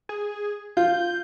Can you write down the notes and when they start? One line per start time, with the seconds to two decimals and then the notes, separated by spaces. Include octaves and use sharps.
0.09 G#4
0.77 F4 G6